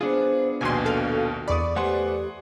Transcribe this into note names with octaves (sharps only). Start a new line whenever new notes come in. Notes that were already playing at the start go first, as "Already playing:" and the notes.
B3 D4 F4 G#4 C5
A#1 D#2 B2 F#4 G#5 C6
A4 F5
E2 D5 B5 C#6 D#6
A3 G4 B4 C5 F#5 G#5 C6